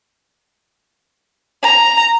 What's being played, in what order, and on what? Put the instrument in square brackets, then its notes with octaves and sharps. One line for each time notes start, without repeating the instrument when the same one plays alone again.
[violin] A#5